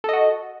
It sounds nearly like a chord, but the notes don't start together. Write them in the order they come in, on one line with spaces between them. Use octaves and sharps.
A4 D#5 F#4